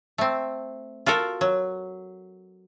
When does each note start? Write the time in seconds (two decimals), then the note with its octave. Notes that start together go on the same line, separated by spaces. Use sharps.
0.18 A3 C4
1.06 F4 F#4 A4 A#4
1.41 F#3